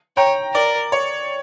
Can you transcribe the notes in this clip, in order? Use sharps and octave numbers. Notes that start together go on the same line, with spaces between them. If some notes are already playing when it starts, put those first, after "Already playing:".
C#5 G5 A#5
A#4 D5
C#5